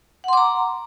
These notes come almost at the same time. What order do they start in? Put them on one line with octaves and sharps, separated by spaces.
F#5 C6 D6 A#5